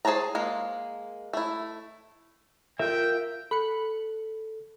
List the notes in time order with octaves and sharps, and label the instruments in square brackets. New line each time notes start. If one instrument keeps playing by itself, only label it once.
[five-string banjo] G#4 C5 C#5 A5 A#5
G#3 A#3
A3 E4
[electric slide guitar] F4 A#4 E5 [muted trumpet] G5
[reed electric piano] A4 [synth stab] B5 F#6 C#7